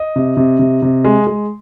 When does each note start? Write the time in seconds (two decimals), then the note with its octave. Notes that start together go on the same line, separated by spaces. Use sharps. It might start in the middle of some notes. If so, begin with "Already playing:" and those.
Already playing: D#5
0.16 C3
0.37 C3
0.59 C3
0.82 C3
1.05 G#3
1.27 G#3